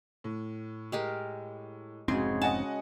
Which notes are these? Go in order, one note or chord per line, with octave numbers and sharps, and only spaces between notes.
A2
G#3 G4 A#4
F1 G#2 C#3 G#3 C4 F#4 G#4
D#5 F#5 G#5 A5